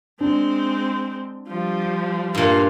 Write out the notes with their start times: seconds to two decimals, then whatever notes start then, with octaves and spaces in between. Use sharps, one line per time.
0.21 G#3 C4 D4
1.48 F3 G3
2.35 G2 A#2 F4 F5